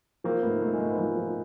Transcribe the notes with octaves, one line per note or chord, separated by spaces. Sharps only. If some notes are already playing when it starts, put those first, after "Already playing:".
F3 A#3 C4
G#2 A3 B3
G#2 A3
G#3
G#2 A3
B3
F3 G#3 A#3
F3